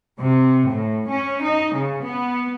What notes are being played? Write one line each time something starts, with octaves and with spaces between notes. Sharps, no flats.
C3
A2
C#4
D#4
C#3
B3